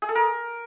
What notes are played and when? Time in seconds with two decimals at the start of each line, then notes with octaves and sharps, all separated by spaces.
0.02 G#4
0.09 A4
0.15 A#4